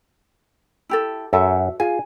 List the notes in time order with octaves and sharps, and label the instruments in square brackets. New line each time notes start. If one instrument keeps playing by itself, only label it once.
[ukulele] E4 G4 A4
[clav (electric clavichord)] F#2 [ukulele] F#4 A4 E5
[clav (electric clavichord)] F4 G#4 [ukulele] G#5